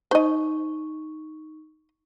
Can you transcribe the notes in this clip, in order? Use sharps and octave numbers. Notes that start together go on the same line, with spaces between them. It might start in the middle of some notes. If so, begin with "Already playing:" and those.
D#4 C5 D#5 C#6